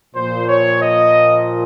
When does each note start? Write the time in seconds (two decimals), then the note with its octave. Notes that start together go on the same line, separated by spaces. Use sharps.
0.14 A#2 F3 C5
0.49 C#5
0.82 D#5